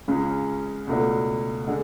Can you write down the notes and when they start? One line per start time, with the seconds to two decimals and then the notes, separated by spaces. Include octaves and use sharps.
0.08 C#2 C#3 G#3 C#4
0.87 C#2 B2 A3 D4
1.67 D3 G#3